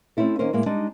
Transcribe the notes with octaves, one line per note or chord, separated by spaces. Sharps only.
A3 C4 C#4 E4 A4
D#3 A#3 C#4 A#4 C5
A2 G#3 A#3 E4
G3 G#3 D4 D#4